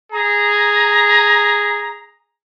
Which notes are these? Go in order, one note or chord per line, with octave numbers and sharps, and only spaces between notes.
G#4 A#5